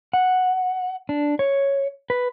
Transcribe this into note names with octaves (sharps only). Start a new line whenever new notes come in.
F#5
D4
C#5
B4